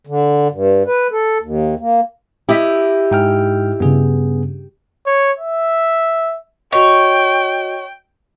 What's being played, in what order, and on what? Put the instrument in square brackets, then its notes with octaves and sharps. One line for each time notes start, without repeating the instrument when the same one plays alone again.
[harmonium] D3
G2
B4
A4
D#2
A#3
[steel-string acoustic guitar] E4 D#5 [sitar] G4
[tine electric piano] G#2 G5 F6
[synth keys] G2 C#3 [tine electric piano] B3 G#4
[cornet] C#5
E5
[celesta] F#4 D#5 [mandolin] C#5 [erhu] G5